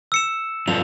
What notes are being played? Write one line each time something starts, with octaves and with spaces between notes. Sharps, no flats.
E6 C#7 E7
G2 F3 A4 F7